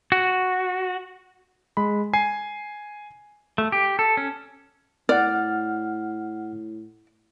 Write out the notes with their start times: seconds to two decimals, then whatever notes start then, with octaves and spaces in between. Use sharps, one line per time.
0.12 F#4
1.77 G#3 B5
2.13 G#5 C7
3.58 A3
3.72 G4
3.99 A4
4.17 C#4
5.09 A2 D5 F#5 F6